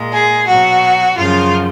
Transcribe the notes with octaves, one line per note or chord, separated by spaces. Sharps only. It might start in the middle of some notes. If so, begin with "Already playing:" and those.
Already playing: A#2 G#3
G#4
B2 F#3 F#4
F#2 C#3 F3 F4